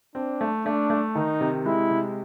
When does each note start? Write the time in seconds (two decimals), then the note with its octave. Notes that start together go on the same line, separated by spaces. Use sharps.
0.15 C4 D4
0.41 A3
0.65 A3 D4
0.90 A3
1.15 D#3 D#4
1.41 C3
1.65 G#3 E4
1.91 C3